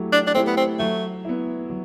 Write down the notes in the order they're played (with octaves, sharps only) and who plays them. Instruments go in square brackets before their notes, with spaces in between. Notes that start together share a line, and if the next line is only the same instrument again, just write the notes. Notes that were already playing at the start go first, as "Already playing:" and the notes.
Already playing: [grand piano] F#3 A3 E4 G4
[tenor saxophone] D4
D4
[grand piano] A3 E4 G4 [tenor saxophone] C4
[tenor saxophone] B3
C4
[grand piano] F#3 [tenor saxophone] A3
[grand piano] B3 E4
F#3